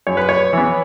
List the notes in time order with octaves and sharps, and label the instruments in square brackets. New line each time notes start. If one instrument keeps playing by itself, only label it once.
[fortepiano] F#2 C#5
B4
C#5
E3 B3